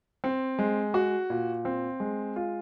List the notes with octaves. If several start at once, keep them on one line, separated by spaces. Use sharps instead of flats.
C4
G#3
F#4
A#2
C4
G#3
F4